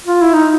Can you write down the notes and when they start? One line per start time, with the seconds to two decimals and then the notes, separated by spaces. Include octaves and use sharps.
0.06 F4
0.21 E4
0.33 D#4